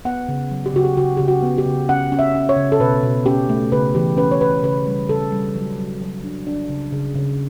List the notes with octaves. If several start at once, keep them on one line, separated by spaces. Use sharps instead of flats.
B3 F#5
C#3
F#3
G4
C#3 F#4
G4
C#3 F#4
C#3 G4
F#4
B3
G4
C#3
C#4 F#5
C#4
E5
C#4
C#5
C#3
A4
B2 B4
B2
C#4 G4
A3
C#3 B4
E3 G4
C#4 B4
C#5
C#4 B4
C#3 B4
G3
C#3 A4
G3
F#3
F#3
F#3
D4
D4
C#3
C#3
C#3